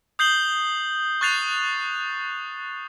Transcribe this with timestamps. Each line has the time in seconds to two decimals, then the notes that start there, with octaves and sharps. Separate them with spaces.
0.19 D#6 G6 C7 F#7 G7
1.21 C#6 F#6 A6 C7 F7